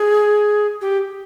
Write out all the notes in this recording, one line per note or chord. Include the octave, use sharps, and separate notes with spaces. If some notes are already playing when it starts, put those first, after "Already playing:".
Already playing: G#4
G4